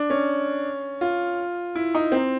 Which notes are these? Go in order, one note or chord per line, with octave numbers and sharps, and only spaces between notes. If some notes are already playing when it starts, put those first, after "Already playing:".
Already playing: D4
C#4
F4
E4
D#4
C4